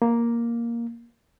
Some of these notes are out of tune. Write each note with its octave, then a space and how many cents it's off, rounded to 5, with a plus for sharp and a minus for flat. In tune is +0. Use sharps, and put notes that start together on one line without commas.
A#3 +5